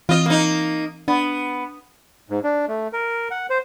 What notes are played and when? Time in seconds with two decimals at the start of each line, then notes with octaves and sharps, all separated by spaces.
0.09 E3 C4 F4 D#5
0.26 A#3 D#4
1.08 B3 D4
2.30 G#2
2.44 D4
2.68 A3
2.93 A#4
3.31 F#5
3.50 C5